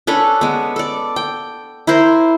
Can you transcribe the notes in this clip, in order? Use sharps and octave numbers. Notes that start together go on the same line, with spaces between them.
C#4 D4 A4 B4
G#3 B3
A4 D5
G5
E4 A#4 C5 C6